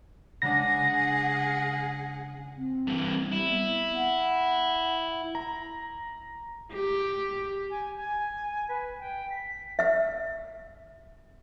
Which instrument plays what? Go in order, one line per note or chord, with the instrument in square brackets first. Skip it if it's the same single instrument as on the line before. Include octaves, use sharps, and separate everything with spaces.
[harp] C#3 G#3 D4 [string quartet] G#4 F#5 [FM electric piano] A#6
[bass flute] C4
[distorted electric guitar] G2 E3
[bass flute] G3 [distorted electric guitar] E4
[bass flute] B3
F#5
[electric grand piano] A#5
[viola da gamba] G4
[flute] G#5
G#5
B4
G5
B6
[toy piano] E5 E6